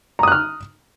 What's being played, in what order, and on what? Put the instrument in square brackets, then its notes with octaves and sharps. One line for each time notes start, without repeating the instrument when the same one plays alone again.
[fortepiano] A#5
D#6
F#6
F6